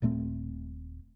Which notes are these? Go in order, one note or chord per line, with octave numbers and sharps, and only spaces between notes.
D#1 A#2 A3 C4